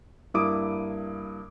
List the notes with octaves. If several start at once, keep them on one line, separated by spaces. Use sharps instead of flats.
G2 A#3 E4 D6 D#6 D7